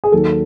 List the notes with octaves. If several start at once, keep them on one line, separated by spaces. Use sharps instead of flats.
G#4
D#2 D#3 F#3 A4